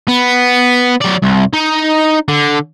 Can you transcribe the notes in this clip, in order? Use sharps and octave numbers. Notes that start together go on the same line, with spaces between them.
B3
F#3 D5
C2
D#4
D3